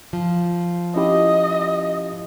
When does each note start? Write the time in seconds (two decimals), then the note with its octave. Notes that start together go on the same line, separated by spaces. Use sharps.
0.13 F3
0.96 C#4 E4 G4 D#5